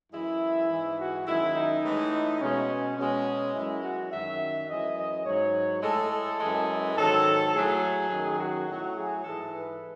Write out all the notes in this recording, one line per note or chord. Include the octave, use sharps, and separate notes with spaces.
F#2 E3 G#3 E4
G#2 E3 G#3
F#4
F#2 D#3 G#3 E4
D#4
A2 E3 G#3
B2 G#3 C#4
B2 G#3 C#4
F#2 E3 G#3 E4
F#4
F#2 D#3 F#3 E5
F#2 E3 G#3 D#5
D#5
G#2 F#3 C#5
A2 G#3 A4
A4
F#2 E3 G#3
G#2 D#3 F#3 A4
A2 F#3 G#4
F#2 D#3 F#3
F#4
A2 F#3
G#4
G#2 E3 G#3 A4
B4